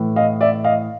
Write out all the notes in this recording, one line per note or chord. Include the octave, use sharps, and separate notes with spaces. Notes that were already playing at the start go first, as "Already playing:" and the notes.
Already playing: A2 E3
D#5 F5
D5 E5
D#5 F5